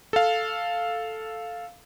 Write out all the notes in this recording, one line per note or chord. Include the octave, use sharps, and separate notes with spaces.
A4 F5